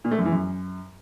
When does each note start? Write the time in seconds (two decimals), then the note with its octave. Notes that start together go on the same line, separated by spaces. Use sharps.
0.04 A#2
0.11 A3
0.18 F#2
0.25 E3
0.32 F#2